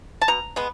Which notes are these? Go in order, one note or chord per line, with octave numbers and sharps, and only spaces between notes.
A5
B2 A#5
G#3 B3